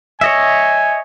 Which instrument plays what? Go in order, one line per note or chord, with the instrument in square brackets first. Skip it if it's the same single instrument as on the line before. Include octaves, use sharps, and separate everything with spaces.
[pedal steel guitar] C#5 D#5 E5 [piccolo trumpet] G#5